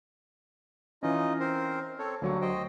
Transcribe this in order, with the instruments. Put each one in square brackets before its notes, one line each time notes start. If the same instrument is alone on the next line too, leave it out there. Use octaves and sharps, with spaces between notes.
[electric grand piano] E3 C#4 [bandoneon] D#4 F4 D#5
[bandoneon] C4 A#4 C5
C4 A4 C#5
[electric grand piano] D2 F#3 C#6 [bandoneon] G3 A#3
[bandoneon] C5 D#5 G5